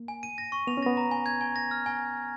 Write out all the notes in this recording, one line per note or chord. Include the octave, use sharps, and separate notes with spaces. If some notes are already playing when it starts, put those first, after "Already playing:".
Already playing: A#3
G#5
D#7
A#6
C#6
B3 F7
C#4
B3 A#6
A#5
G#5
G#6
G#5
A#6
F6
G#5